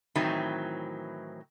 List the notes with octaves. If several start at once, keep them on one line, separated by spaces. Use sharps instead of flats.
A2 D#3 E3 F#3 C4